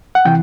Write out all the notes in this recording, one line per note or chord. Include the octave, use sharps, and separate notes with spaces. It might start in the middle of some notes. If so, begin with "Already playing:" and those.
F#5
C3 E3 G5